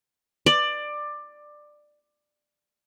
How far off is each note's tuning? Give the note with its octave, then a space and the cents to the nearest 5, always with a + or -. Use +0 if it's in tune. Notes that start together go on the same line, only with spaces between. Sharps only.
D5 +15